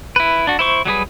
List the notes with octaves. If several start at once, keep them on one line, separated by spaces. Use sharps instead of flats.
E4 B4
D4 F#4
E4 C5 C#6
F#3 G3 G#4 B4